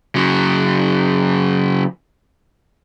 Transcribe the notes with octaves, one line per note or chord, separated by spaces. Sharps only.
C#3 F#3